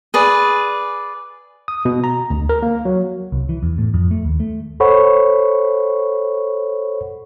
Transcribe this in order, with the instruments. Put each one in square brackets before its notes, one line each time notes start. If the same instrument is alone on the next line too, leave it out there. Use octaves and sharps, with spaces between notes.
[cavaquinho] G#4 B4 D5
[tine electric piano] D#6
B2
A#5
D2
A#4
A#3
F#3
[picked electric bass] C2
E3
E2
A2
F2
A3
D#2
A3
[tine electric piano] A4 C5 C#5 F#5 B5 C#6